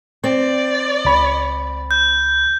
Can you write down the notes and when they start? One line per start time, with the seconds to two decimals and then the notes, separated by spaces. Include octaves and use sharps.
0.24 C4 D5
1.05 C#2 B5
1.91 G6